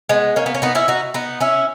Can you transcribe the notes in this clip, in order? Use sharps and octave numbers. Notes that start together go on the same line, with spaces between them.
G#3 B3
A#3 C#4
B3
C#4
B3 D#4
C#4 E4
D#4 F#4
B3 D#4
C#4 E4